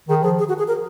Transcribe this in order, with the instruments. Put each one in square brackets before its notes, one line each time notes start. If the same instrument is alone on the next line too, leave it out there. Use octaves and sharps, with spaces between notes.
[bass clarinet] D#3 [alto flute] G#4
[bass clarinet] F3 [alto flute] G#4
[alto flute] G#4
F#4
G#4
A#4